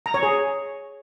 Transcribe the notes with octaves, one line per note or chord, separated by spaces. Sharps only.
A#5
C#5
G#4